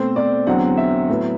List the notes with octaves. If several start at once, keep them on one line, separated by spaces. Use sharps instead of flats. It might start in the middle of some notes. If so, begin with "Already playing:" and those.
Already playing: B2 A3 C4 C5
D5
E2 D3 F#3 C4 F#5
E5
A2 F#3 B3